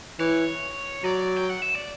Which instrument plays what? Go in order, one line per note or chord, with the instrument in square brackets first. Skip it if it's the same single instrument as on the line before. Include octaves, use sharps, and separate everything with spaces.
[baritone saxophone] E3 [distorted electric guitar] C#5
[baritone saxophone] F#3 [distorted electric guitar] D5
[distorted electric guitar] G5
F#5
E5
D5